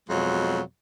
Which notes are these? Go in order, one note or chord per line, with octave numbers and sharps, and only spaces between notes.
F2 B2 F#3 G#3